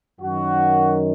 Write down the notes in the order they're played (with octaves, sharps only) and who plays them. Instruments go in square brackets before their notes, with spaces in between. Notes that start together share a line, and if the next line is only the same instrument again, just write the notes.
[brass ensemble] F#2 D#3 F#4